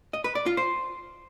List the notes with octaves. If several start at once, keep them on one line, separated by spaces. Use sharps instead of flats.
D#5
B4
D5
F4
C5